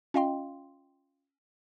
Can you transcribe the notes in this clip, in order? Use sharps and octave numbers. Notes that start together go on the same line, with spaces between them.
C#4 F4 D#5 F5 G5 C6